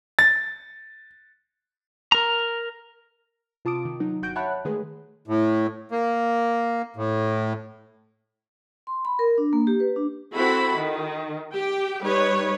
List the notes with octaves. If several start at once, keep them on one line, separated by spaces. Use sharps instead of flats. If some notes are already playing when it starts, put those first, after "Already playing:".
A6
A#4 A#5
C3 F4 A5 D6 D#6 D7
D#3
F#3 D#4
G1 F#4 G6 D7
C#5 E5 F#5 A5 B5 F#6
D#3 G#3 A3 G#4 B4
A2
A#3
A2
C6
B5
A#4
D4
A#3
G4
B4
D4
C4 E4 F#4 A4 B5
D#3
G4 G5
G3 D#4 B4 C#5